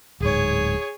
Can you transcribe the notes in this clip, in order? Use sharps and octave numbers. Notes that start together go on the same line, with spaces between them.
D1 G#2 G#4 C#5